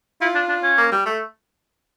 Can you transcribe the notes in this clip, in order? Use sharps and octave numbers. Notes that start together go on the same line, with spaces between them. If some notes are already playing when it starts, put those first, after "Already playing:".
E4 F4
D4
D4
C#4
A#3
G3
A3